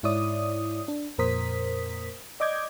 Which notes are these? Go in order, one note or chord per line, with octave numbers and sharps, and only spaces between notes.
G#2 E4 C#5 D5 D#6
D4
F2 A#2 A#4 C5 D#6 B6
D5 D#5 D6 G6 G#6